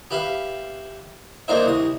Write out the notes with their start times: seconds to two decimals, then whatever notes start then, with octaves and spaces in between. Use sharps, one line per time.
0.11 G4 B4 E5 F5
1.48 A#3 D4 D#4 A#4 C5 E5
1.66 C2 D#6